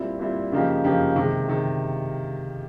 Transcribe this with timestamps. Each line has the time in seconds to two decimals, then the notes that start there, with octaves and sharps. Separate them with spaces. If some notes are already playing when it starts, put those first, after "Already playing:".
Already playing: A#2 G3 C4 E4
0.19 A#2 G3 C4 E4
0.52 C#3 F3 A#3 D#4 G4
0.84 C#3 F3 A#3 D#4 G4
1.16 C3 D#3 G#3
1.49 C3 D#3 G#3